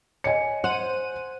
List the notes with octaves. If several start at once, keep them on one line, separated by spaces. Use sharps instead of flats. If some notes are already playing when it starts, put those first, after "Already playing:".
C#5 D#5 G#5 C#7
C5 F#5 D#7